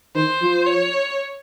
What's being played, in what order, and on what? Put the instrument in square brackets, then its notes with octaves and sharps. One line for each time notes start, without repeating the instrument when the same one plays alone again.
[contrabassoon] D#3 [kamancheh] C5
[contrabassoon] F3
[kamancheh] C#5